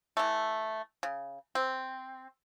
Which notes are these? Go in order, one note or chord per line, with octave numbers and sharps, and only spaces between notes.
E3 A3
C#3
C4